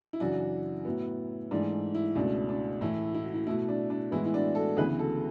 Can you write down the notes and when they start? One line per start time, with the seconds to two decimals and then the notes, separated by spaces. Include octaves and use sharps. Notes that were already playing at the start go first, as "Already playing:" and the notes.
0.13 E4
0.20 F#2 C#3 E3 D4 F#4
0.85 A2 F#3 B3
1.51 G#2 E3 A3 D4
1.95 E4
2.16 C#2 B2 A3 D4
2.49 D4
2.81 A2 E3 A3 E4
3.15 E4
3.23 F#4
3.34 E4
3.47 B2 A3 E4
3.68 D4
3.90 D4
4.11 A2 E3 G#3 B3 E4
4.26 E4
4.34 D4 F#4
4.55 F#4 A4
4.76 D2 C#3 E3 B3 G#4 B4
4.99 F#4 A4